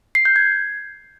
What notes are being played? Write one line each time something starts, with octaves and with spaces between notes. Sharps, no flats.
C7
G6
G#6